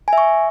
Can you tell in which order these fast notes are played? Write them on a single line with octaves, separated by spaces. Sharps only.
G#5 E5 C#6